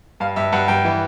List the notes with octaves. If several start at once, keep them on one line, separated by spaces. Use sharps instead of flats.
G2 F5
G2 E5
G2 F#5
G2 G5
E3